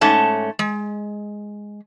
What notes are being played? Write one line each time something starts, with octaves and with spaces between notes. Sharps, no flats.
G#2 A3 C#4 A5
G#3